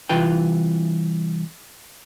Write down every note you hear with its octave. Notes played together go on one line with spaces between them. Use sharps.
C2 C3 E3 F4 B4 G5